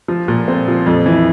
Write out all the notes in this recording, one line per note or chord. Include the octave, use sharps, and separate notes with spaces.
F3
A#2
C4
F3
F2
E3